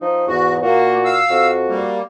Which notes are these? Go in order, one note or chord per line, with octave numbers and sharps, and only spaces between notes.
F3 D#4
E2 G#2 F#4
A#2 A#3 F#4
F5 E6
F2 F#4
G3 A#3